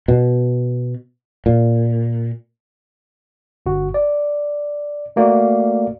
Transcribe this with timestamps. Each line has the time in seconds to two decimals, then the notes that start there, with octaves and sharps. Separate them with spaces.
0.08 B2
1.46 A#2
3.66 G1 F#4
3.94 D5
5.16 A3 A#3 F#4 D5